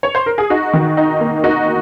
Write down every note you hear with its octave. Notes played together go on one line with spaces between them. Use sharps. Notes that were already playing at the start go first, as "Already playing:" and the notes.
C#5
C5
A#4
G#4
D#4 F#4
D#3
D#4
A#3
D#4 F#4